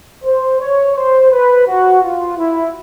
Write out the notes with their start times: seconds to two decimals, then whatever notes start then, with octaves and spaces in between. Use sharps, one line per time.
0.25 C5
0.61 C#5
0.96 C5
1.32 B4
1.67 F#4
2.03 F4
2.38 E4